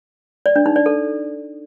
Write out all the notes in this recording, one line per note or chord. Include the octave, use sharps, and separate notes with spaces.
D5
D4
D#4
D5
A4